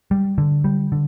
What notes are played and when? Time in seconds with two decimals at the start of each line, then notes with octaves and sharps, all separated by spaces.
0.11 G3
0.38 D3
0.64 G3
0.92 D3